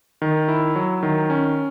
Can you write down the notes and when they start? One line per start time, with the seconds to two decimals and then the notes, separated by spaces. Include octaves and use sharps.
0.22 D#3
0.48 E4
0.75 F#3
1.03 D#3
1.30 C#4